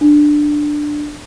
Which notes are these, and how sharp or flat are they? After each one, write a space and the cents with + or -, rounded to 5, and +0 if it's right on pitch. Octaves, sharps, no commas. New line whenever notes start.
D4 +10